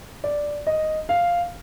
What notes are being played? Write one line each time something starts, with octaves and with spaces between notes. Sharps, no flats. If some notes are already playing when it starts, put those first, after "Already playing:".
D5
D#5
F5